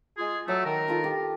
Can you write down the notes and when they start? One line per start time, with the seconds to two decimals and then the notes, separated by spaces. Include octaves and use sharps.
0.18 G#3 F4 G#4
0.48 F#3 A3 D6
0.66 D#3 A#4
0.88 D#4 F4 A4
1.04 G4